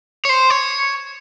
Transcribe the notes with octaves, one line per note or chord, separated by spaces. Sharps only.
C#5
C5
C#5